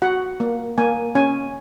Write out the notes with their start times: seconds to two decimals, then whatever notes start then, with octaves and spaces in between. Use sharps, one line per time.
0.02 F#4 F#5
0.40 A#3
0.78 A#3 G#5
1.15 C#4 G#5